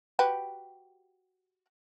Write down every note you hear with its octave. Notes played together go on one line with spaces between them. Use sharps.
F#4 G4 B4